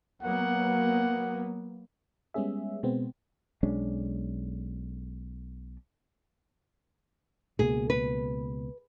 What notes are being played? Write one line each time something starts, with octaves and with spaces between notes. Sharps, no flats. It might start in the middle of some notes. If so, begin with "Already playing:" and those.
F#3 A#3 B3 F#5
G3 G#3 B3 C#4 G#4 E5
B2 G#3 B3 C4
B1 G#3 C#4 D4
C#2 B2 A#3 G#4
B4